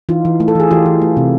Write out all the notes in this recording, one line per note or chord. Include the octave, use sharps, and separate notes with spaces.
E3 D#4 F4
E3
A3
A4
E3 G#4
E3 F4 G4
E3
A3
C3